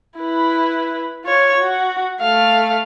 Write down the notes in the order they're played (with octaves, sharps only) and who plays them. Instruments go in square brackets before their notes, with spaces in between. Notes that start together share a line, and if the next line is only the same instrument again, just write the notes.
[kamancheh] E4 B4
F4 C#5
F#4
A3 F5